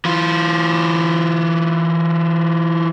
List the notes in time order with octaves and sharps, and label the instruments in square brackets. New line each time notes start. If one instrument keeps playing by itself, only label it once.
[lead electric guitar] E3 F4